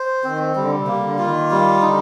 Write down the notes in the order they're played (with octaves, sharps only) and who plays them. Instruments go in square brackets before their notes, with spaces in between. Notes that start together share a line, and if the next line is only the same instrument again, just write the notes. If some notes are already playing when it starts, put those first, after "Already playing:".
Already playing: [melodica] C5
[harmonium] D#3 [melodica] C4
[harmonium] D3 [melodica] G3
[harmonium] C3
[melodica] A#3
[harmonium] C3
D3
[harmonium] D#3 [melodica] F4
[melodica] G3
[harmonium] D3 [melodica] D#4